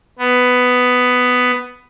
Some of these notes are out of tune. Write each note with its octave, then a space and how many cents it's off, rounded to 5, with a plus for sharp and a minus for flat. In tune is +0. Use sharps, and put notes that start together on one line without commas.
B3 +10